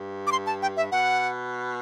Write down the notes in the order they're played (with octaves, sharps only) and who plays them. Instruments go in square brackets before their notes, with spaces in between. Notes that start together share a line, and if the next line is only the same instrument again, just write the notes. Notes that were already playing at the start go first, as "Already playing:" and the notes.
Already playing: [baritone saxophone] G2
[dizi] D6
C6
A5
G5
E5
[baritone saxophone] B2 [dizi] F#5